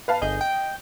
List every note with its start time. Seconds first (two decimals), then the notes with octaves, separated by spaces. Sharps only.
0.08 B4 F5 A5
0.22 G1 G#4 D#5 G6
0.41 G5